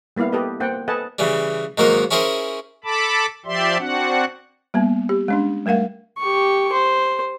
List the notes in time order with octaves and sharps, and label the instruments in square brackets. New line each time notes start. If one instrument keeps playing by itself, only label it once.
[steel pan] G3 A#3 B3 E4 F5
G4 A4 B4 D#5
A#3 C4 F#5 G5
A4 B4 D#5 F#5 G#5 A5
[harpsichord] C#3 E3 G3
G#2 D#3 F#3 A#3 A#4
C#4 E4 G#4 A#4 C5
[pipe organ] A4 A5 B5 D6
F3 G4 D5 E5 C6
C4 D4 F#4 F#5
[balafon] G3 A#3 B3
G4
G#3 C#4 D4
G3 A3 A#4 F5 F#5
[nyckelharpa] G4 C#6
C5